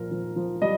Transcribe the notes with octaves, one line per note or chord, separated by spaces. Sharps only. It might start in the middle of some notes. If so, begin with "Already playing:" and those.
Already playing: A#2 F3 A#4
F3
F3
G3 D#5